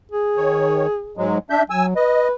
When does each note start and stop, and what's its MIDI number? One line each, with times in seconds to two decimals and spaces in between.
0.11 1.17 68
0.37 0.87 51
0.37 0.87 73
1.17 1.38 44
1.17 1.38 54
1.17 1.38 56
1.50 1.63 62
1.50 1.63 76
1.50 1.63 91
1.70 1.96 54
1.70 1.86 80
1.70 1.86 88
1.96 2.33 71
1.96 2.28 75